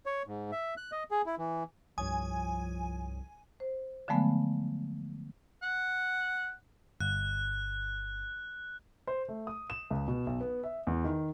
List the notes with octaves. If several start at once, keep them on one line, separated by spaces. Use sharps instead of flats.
C#5
G#2
E5
F#6
D#5
G#4
E4
E3
C2 G2 F3 C#5 G#5 D#6
C5
D3 F3 F#3 G#3 A3 B3
F#5
G1 F#6
C5
A3
D#6
E7
C#2
B2
B1
B3
E5
E2
D#3